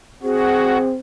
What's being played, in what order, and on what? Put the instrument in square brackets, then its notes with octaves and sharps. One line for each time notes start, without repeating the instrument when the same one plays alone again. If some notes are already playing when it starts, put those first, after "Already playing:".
[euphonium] C4 [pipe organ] F#4 [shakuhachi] G#4